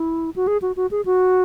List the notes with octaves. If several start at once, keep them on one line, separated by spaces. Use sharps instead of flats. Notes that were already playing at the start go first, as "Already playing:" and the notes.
Already playing: E4
F#4
G#4
F#4
F#4
G#4
F#4